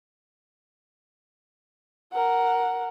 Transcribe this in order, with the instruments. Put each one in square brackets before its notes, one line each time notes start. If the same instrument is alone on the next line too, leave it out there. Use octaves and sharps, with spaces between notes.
[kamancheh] A#4 F#5